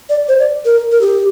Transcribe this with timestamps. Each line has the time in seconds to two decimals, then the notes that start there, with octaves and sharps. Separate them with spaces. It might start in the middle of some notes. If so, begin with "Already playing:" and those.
0.09 D5
0.28 C5
0.40 D5
0.65 A#4
0.92 A#4
1.01 G4